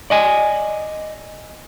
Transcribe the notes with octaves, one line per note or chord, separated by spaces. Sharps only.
D5 D#5 G#5